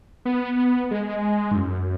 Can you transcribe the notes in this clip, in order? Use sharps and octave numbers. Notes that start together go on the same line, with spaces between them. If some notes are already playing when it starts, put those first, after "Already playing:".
B3
G#3
G#2
F#2